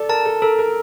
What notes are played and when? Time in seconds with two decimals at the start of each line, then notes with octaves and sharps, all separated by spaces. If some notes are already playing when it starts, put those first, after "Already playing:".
Already playing: A4 D5
0.09 A#4 A5
0.25 A4
0.42 A4 A#4
0.59 A#4